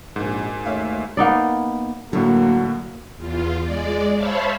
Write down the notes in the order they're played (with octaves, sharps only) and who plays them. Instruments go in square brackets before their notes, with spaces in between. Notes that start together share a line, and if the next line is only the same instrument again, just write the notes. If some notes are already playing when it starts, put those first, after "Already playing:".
[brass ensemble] A#1 [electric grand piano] G#2 [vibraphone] F#4 A#4 G#5
[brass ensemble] D#2 A3 [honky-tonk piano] C#5 E5 F5
[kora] A#3 B3 D#4 D5
[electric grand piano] A2 D3 [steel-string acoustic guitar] F#3 [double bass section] A#3 [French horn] F#4
[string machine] E2 F4
G#3 D5
C5 C#5 E5 F5 A5 B5